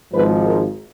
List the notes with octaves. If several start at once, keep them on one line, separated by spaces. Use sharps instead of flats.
G#1 G#2 F3 B4
A#4